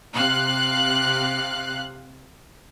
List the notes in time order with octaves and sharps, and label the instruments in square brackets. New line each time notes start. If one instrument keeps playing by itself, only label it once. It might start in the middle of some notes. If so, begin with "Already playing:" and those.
[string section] C3 F5 F#6